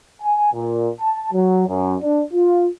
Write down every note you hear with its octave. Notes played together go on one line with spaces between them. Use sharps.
G#5
A#2
A5
F#3
F#2
D4
F4